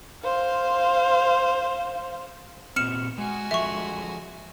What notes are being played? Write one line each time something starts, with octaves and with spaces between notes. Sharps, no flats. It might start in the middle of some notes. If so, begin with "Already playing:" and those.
C5 F5
A#2 B3 C4 F6 C#7 E7
G#3 F#4 G#5
F3 G#3 A4 E5 C#6